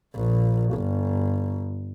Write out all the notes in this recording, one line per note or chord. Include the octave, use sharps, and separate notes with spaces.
A#1
G1